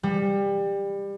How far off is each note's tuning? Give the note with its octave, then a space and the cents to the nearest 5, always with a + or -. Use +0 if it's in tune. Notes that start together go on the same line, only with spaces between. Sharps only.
G3 +20